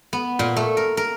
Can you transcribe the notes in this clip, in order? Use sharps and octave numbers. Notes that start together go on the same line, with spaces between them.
B3
A#2
A3
A#4
A#4